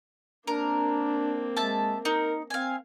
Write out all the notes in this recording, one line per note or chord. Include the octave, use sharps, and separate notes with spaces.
A#3 C4 D4 A#4
G#3 E5 A5
D#4 A#4
C4 F5 G#5